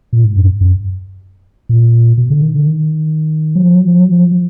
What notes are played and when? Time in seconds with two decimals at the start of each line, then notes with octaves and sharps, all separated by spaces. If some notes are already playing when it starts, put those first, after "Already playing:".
0.13 A#2
0.24 G#2
0.36 F#2
0.61 F#2
1.69 A#2
2.18 B2
2.30 D3
2.42 D#3
2.55 D3
2.67 D#3
3.56 F#3
3.63 F3
3.75 F#3
3.87 F3
4.00 F#3
4.12 F3